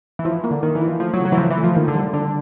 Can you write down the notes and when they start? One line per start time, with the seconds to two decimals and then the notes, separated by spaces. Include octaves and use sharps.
0.19 E3
0.25 F3 E4
0.44 A#3
0.51 D3
0.63 D#3 A#3
0.75 E3
0.82 E4
0.87 F3
1.00 F3 A3
1.14 F#3
1.19 C#3
1.25 F#3
1.32 E3
1.37 C#3 F3
1.50 E3
1.58 A3
1.64 F3
1.76 D#3 A#3
1.88 D3
1.94 G3
2.13 D3 D4